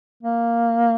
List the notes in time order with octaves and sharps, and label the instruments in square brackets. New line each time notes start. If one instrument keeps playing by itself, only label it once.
[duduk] A#3